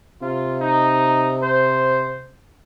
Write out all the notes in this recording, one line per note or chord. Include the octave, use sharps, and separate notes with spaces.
C3 F4
D#4
C5